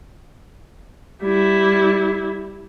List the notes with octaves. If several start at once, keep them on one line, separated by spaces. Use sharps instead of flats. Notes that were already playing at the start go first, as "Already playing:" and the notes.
G3 E4